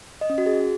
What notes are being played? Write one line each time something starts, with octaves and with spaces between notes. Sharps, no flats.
D#5
C#4
F#4
G#4